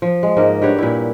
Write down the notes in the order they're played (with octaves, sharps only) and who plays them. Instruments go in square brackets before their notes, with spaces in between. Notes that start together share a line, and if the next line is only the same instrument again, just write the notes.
[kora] F3
G#3
G#2 A#3 D#5
G2 G4 C#5 F#5
A#2 E4